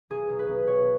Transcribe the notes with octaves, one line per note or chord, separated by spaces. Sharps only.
B1 G#4
B1
B4
B1
B3 C#5